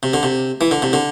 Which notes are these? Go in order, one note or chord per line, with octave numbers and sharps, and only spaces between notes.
C3
D3
C3
E3
D3
C3
D3